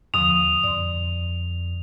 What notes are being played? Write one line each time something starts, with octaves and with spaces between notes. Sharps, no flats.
D#2 D3 F3 D#6 F7
F2 D5 C6